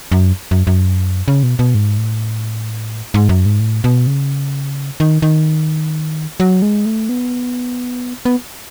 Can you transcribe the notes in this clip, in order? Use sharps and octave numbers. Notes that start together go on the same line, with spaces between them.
F#2
F#2
F#2
C#3
B2
B2
G#2
A2
G#2
F#2
G#2
A2
B2
C#3
D#3
D#3
F#3
G#3
A3
B3
B3